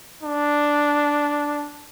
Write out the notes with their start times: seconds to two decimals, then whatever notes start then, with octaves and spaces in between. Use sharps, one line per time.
0.23 D4